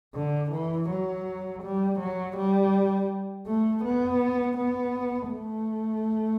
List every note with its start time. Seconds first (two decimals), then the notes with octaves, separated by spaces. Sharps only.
0.15 D3
0.52 E3
0.90 F#3
1.63 G3
2.00 F#3
2.37 G3
3.47 A3
3.85 B3
4.58 B3
5.32 A3